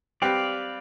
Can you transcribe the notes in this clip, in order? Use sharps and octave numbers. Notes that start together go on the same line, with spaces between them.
G3 C4 G4 B4 D5 F5